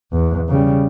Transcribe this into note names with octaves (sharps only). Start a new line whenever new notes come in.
E2
C#3 G3